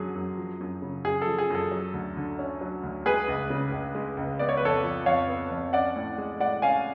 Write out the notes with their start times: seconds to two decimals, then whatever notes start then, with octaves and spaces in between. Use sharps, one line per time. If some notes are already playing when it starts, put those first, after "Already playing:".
Already playing: F#2 D3 F#3 G#4
0.15 F#2
0.38 F3
0.61 F#2
0.82 C#3
1.04 F#2 G#4
1.22 A4
1.27 F3
1.38 G#4
1.50 F#2 A4
1.71 F#3
1.93 D2
2.17 D3
2.39 C#4
2.61 F#3
2.83 D2
3.06 G#3 G#4 B4
3.28 C#2
3.50 C#3
3.72 C#2
3.95 G#3
4.17 C#2
4.39 B3 D5
4.49 C#5
4.57 B4
4.62 F2 A4 C#5
4.84 F3
5.06 F2 C#5 F5
5.29 B3
5.51 F2
5.73 C#4 D5 F#5
5.96 A2
6.18 G#3
6.40 A2 D5 F#5
6.62 C#4 F5 G#5